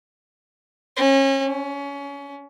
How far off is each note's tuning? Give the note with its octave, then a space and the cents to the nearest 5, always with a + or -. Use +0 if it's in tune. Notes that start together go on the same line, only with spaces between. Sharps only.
C#4 -35
C#4 +25